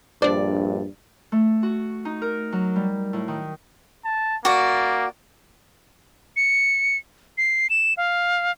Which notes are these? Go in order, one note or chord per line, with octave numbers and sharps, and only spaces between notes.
A#1 G2 D4 C5 D5
A3
F#4
D#4
A#4
F#3
G3
A2
D#3
A5
A#3 F#4 D5
C#7
C7
E7
F5